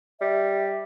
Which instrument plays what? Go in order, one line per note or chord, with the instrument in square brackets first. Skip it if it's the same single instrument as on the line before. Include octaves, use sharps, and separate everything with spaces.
[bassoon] G3 [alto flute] E5